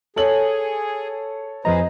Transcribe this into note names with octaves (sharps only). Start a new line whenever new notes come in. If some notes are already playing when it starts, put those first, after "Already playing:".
G#4 A4 C#5 F#7
F2 F3 G#4 B4 C5 D#5 A#5